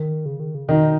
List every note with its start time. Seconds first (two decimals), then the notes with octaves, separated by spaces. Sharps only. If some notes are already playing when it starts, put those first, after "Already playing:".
Already playing: D#3
0.26 C#3
0.40 D#3
0.55 C#3
0.69 B2 D#3 D#4